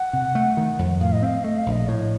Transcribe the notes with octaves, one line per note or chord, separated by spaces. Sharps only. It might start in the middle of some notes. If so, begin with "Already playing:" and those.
Already playing: F#5
C3
A3
D#3
F2
A2 F5
D#5
C4 F5
A3 D#5
F5
A#1
D#5
A2 C#5